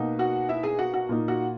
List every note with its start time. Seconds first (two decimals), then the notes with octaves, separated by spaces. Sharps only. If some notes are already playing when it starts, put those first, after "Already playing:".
Already playing: B2 A#3 D#4
0.19 F#4 F#5
0.49 E4 E5
0.63 G#4 G#5
0.79 F#4 F#5
0.94 F#4 F#5
1.09 A#2 A#3 D#4
1.28 F#4 F#5